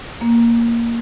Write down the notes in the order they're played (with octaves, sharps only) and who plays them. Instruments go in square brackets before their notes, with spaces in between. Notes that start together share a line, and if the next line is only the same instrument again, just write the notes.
[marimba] A#3